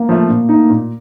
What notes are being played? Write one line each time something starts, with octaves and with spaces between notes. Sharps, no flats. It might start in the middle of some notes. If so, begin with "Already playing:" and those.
Already playing: A#3
F3 A3
A#2
A3 D#4
A#2